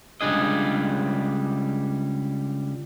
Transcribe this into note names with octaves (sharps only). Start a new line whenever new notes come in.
C#2 G3 D4 G#4 D#5